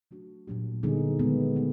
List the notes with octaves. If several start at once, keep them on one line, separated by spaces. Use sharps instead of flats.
F#3 A3 D4 F#4
A#2 F#3 A#3 D4 G4
D3 G3 B3 D#4 G#4
D#3 G#3 B3
G3 B3 D#4